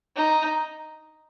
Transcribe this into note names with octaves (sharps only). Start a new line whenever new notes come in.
D#4